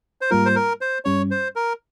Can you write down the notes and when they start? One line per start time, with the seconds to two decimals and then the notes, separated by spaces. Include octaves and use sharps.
0.21 C5
0.30 G#2 G3 A#3 F4 A#4
0.45 C5
0.56 A#4
0.81 C5
1.05 G2 G3 C#4 C#5
1.31 C5
1.56 A#4